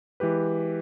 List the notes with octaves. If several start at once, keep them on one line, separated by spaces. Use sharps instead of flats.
E3 G#3 G4 B4